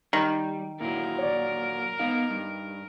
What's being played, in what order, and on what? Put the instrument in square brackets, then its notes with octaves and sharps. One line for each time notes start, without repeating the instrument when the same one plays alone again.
[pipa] D#3 [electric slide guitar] G3
[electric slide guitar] A#2 F#3 [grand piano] E4 [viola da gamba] A#4
[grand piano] C#5 D5
[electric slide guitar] B3 F5 [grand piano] D#4
[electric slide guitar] G2